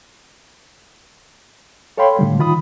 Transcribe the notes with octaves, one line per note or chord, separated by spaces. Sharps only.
A4 C#5 F5 G5 B5 C6
A2 D3 G3
D#3 F4 B5 D#6